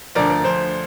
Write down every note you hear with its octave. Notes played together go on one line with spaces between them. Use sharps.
D2 D3 F3 A#4 D5
A#4
D2 D3 F3 C5